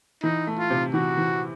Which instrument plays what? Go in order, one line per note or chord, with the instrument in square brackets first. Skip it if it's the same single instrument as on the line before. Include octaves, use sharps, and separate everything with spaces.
[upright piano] E3 [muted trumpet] D#4
[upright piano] A3
[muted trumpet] F4
[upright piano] C3
[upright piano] E3 [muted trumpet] F#4
[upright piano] E3